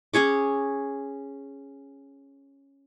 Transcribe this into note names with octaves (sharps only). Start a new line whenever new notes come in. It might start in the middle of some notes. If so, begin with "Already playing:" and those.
C#4 G#4 C#5 D6